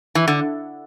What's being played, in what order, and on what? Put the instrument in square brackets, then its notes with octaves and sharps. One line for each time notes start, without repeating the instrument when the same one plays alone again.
[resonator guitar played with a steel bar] E3
D3